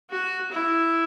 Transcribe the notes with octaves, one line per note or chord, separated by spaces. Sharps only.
F#4
E4